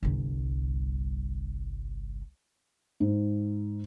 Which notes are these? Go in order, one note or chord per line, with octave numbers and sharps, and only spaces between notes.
G1 C2
G#2